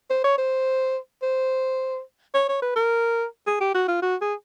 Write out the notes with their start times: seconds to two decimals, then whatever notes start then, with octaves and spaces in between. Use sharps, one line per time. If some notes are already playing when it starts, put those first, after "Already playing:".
0.10 C5
0.24 C#5
0.38 C5
1.22 C5
2.34 C#5
2.49 C#5
2.62 B4
2.76 A#4
3.47 G#4
3.61 G4
3.75 F#4
3.88 F4
4.02 F#4
4.21 G#4